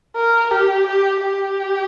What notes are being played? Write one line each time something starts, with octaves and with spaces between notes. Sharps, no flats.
A#4
G4
G4
G4